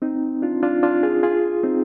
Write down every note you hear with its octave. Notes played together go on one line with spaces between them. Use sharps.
C4 D#4
D4 F4
D4 F4
D4 F4
F4 G#4
F4 G#4
C4 D#4